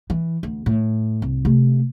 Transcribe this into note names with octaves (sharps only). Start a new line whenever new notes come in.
E3
D2
A2
C2
C3 A3